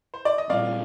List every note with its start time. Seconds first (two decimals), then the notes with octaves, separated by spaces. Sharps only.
0.14 C5
0.25 D5
0.38 D#5
0.50 A#2 G3 C4 D5 F5